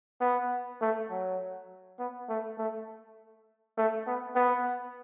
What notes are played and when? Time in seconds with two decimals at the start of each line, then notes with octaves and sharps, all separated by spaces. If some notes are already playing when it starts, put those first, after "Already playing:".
0.21 B3
0.81 A3
1.10 F#3
1.99 B3
2.29 A3
2.58 A3
3.77 A3
4.07 B3
4.36 B3